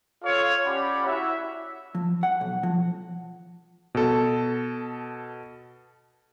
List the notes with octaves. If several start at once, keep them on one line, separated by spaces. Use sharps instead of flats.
F4 A4 C#5 F5
C#4 G4 D5 F#5 B5
E4 F#4 E5
F3
F#5
B1
F3
B2 A4